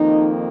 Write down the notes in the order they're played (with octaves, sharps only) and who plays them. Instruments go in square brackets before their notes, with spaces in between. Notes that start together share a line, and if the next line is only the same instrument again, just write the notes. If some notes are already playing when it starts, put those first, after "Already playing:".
Already playing: [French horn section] F2 D#3 A#3 D#4